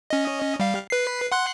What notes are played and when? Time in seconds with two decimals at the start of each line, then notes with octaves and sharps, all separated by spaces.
0.10 C#4 D#5
0.60 G3 F5
0.90 B4 C7
1.32 F#5 C6 F#6